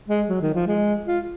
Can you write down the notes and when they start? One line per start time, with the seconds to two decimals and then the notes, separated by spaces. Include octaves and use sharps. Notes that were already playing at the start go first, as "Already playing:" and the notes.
0.08 G#3
0.29 F#3
0.41 D#3
0.54 F3
0.67 G#3
1.06 F4